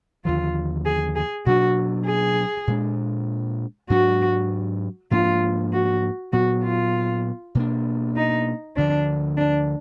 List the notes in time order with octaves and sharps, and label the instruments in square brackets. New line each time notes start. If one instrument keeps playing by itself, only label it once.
[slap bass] D#2 D3 F3 [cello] F4
[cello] G#4
G#4
[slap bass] B2 F#3 D4 [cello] F#4
[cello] G#4
[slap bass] A#2 G#3 D4
[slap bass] G#2 F#3 D4 [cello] F#4
[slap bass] G#2 F3 A#3 D4 [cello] F4
[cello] F#4
[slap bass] A#2 F#3 B3 [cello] F#4
[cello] F4
[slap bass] B2 A#3 D4
[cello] D#4
[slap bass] D2 D3 F3 [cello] D4
[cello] D4